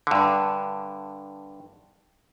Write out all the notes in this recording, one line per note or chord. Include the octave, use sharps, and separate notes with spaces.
G2 D3